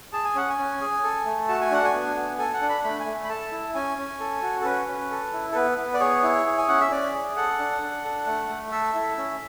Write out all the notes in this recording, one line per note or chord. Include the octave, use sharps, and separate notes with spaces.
G#4 A5
G#5
C#4 F#5
G#5
C#4
G#4
A4
A3
F#4 A5
G#5
D4 F#5
G#5
B3
B3
A4 G#5
F#5
D4
B5
A3 B5
G#5
A3
B5
A4 A5
E4
C#4 G#5
C#4
A4
F#4
A4
C#4 B4
C#4
A4
E4
A4
B3 B4
B3
D5
G#4 C#5
E4
G#4
G#5
C#4 F#5
E5
C#4 D5
G#4
A4 F#5
D4
D4
A4
A3
A3
A4 E5
E4
C#4